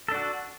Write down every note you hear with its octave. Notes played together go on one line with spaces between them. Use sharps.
D4 F#4 A4